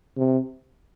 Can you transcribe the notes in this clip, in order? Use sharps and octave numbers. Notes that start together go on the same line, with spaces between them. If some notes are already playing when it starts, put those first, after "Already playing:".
C3